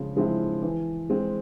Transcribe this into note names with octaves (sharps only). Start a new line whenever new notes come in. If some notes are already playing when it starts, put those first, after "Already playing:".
Already playing: C#3 F3 G#3 C4
F3 G#3 C4 E4
E3
G#3 C4